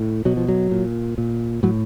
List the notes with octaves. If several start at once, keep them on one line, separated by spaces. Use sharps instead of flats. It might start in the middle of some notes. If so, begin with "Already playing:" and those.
Already playing: A2
B2 F#3
F3
F#3
A#2
A#2
A2 F#3